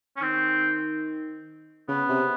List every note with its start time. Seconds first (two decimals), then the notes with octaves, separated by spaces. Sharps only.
0.16 C#4
0.21 D#3 C4
1.88 C#3 B3
2.09 C3